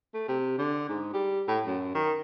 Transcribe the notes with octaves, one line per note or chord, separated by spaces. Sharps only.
A3
C3
D3
G#2
G3
A2
F#2
D#3